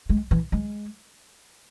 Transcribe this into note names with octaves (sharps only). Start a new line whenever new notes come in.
G#3
E3
G#3